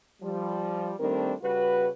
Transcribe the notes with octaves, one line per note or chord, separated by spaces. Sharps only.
F3 G3
D#3 G3 A3 C4 D4 A#4
C#3 G3 F#4 B4